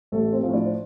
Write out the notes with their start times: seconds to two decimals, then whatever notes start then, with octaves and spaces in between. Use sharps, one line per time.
0.12 A1 A3 A4
0.33 C4 C5
0.43 A2 F3
0.54 D4 D5
0.65 C5